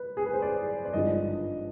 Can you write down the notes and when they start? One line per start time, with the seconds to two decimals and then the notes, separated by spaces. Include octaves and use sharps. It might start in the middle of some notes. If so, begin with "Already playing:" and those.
Already playing: B4
0.17 G#4
0.26 B4
0.33 C5
0.42 D5
0.85 D5
0.93 G#1 G2 D3 F3 D#5